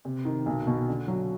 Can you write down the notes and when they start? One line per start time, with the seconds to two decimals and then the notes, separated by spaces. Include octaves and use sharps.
0.05 C3
0.25 D#3
0.46 B1
0.67 B2
0.88 D3
1.08 F#3